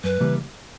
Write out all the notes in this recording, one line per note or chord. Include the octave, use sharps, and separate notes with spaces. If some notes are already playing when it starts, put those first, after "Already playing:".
F#2 B4
C#3 E3 G3 A#3